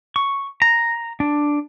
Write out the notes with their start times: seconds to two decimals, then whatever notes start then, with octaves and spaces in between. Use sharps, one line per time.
0.16 C#6
0.62 A#5
1.20 D4